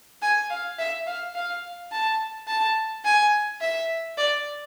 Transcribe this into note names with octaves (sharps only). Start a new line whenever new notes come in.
G#5
F5
E5
F5
F5
A5
A5
G#5
E5
D5